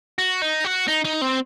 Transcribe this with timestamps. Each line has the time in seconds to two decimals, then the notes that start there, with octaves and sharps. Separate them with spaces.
0.19 F#4
0.42 D#4
0.65 F#4
0.88 D#4
1.05 D#4
1.21 C4